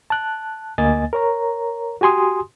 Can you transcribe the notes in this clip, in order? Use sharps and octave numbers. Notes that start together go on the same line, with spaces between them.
A5 F#6
D2 A#3 D#5 G#5 A6
A#4 C#5 A#5
F#4 G4 G#5 C6 D#6